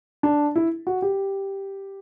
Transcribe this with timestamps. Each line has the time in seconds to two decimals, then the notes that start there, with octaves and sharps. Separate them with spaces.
0.23 D4
0.56 E4
0.87 F#4
1.02 G4